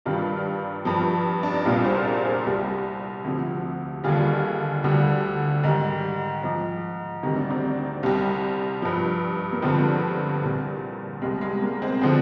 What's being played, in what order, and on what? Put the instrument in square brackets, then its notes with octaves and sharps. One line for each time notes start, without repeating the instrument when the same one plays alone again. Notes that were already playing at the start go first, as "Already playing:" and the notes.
[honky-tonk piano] G2 D#3 G3 D4 F4
G2 F3
D4
D#4
C2 A#2 G3 D4 F4
G#4 C5
A#4 D5
G#4 C5
C2 C3 G3
D2 C3 F3
D#2 D3 G3 F4 G#4
D2 D3 G3
G#2 D#3 G3
G#2 F3
D2 C3 D#3 G3 D#4
D4
C4 D#4
C2 C3 G3
G2 F3
A#3
G2 D3 F3 G#3 C4
C2 A#2 G3
C2 C3 G3 G#3
G#3
A#3
G#3 C4
D3 F3 G#3 C4